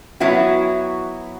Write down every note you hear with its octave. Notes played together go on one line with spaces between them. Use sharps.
F#3 B3 E4 F#4